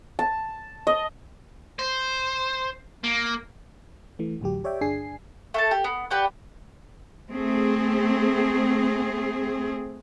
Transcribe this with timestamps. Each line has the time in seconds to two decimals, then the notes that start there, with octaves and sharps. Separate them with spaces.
0.19 A5
0.87 D#5
1.79 C5
3.04 A#3
4.19 E3 A3
4.41 A1 D2 F#3 G4
4.64 G4 C#5 D5 E5 G5
4.81 G1 D4 G#4 G#5 C7
5.54 A3 A4 A5
5.71 G4
5.84 B3
6.11 G4 B4 D5 F#5
7.31 A3 C4 G#4